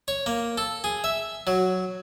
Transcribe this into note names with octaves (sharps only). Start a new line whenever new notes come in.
C#5
A#3
A4
G#4
E5
F#3